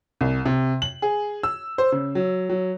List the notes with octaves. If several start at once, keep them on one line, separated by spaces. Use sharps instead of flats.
C2
C3
F#7
G#4
E6
C5
C#3
F#3
F#3